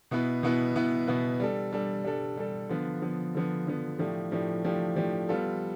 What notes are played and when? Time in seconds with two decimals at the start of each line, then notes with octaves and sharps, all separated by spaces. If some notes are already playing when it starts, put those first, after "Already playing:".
0.11 B2 B3 E4 B4
0.43 B2 B3 E4 B4
0.76 B2 B3 E4 B4
1.07 B2 B3 E4 B4
1.40 G3 D4 A4
1.73 G3 D4 A4
2.04 G3 D4 A4
2.37 G3 D4 A4
2.69 D3 F3 B3
3.02 D3 F3 B3
3.34 D3 F3 B3
3.67 D3 F3 B3
3.99 A2 F3 A3 D4 G4
4.31 A2 F3 A3 D4 G4
4.64 A2 F3 A3 D4 G4
4.96 A2 F3 A3 D4 G4
5.29 G3 B3 F4 A4